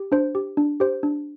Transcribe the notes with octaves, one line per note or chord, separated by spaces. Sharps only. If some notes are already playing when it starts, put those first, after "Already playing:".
Already playing: G4
D4 C5
G4
D4
G4 C5
D4